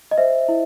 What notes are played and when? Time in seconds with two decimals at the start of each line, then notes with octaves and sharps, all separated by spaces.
0.11 D#5
0.18 C5 E5
0.48 E4